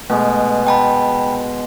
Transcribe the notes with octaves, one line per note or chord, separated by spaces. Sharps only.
B2 G#3 A3
G5 A5 B5